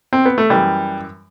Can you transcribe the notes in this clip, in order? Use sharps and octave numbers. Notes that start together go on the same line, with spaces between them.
C4
B3
A3
F#2 E3 G3